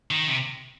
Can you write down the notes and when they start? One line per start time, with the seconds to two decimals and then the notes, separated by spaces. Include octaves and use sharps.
0.11 D#3
0.27 C3